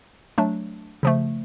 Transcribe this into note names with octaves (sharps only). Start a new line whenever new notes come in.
F#3 A3 D4
C#3 F3 A3